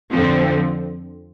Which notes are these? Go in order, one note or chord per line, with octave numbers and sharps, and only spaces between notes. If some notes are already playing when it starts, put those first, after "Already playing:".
F2 D3 F3 C4